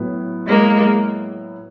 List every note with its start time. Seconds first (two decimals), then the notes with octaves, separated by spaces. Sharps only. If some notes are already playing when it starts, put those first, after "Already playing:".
Already playing: A2 F#3 B3 E4
0.47 G#3 A#3